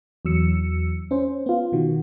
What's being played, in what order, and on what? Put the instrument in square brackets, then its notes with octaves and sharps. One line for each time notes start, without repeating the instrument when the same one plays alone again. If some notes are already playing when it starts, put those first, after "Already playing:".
[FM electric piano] E2 F#3 E6 C#7
C#4 C5
B3 F4
B2 D#3 F#4